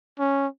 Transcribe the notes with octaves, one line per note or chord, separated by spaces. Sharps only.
C#4